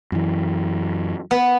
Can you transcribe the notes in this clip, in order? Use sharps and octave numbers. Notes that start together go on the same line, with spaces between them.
F#2 E3
B3